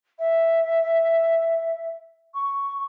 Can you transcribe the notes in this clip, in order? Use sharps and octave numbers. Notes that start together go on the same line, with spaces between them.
E5
C#6